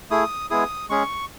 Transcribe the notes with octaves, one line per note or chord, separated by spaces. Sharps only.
A3 E4 G#4 D#6
G#3 B3 E4 G#4 D#6
G#3 C#4 G#4 C#6